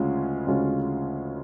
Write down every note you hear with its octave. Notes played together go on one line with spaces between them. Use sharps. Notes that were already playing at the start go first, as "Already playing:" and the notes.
Already playing: D2 C#3 G#3 C#4 F4
D2 C#3 G#3 C#4 F4